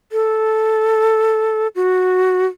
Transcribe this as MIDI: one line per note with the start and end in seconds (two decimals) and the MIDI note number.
0.12 1.68 69
1.76 2.46 66